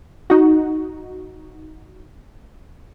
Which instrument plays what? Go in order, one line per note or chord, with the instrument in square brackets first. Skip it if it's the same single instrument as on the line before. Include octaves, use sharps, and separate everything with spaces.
[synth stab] D#4 F#4